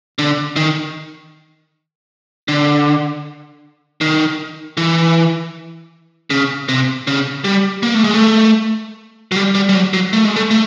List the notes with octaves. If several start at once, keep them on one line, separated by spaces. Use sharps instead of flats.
D3
D#3
D3
D#3
E3
C#3
C3
C#3
G3
A#3
A3
G#3
A3
F#3
G3
G3
G3
F#3
F#3
A3
G#3
A3
A3